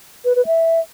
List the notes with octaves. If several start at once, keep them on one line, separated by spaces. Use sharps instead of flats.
B4
B4
E5